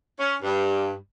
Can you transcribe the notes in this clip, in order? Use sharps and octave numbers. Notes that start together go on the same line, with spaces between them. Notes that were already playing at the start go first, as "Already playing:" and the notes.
C#4
G2